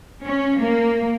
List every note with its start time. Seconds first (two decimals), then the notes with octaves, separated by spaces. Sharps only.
0.25 C#4
0.60 A#3